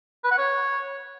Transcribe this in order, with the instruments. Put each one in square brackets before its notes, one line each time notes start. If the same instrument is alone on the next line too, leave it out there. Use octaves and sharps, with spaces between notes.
[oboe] B4
F#5
C#5